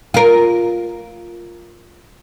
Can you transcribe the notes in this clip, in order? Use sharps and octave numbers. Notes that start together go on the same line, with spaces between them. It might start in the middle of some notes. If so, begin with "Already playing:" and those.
F4 A#4